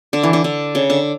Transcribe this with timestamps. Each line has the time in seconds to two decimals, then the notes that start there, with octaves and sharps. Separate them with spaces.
0.13 D3
0.23 E3
0.33 D3
0.44 D3
0.75 C#3
0.90 D3